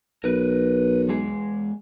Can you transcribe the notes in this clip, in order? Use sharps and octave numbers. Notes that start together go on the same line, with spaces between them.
B1 A#4 B4
E2 G#3 G#4